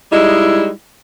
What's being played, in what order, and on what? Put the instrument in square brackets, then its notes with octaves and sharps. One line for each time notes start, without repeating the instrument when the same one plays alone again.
[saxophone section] G3 G#3 D#4 E4